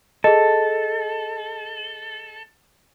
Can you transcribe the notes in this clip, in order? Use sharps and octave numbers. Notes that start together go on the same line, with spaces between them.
G#4 A4 D#5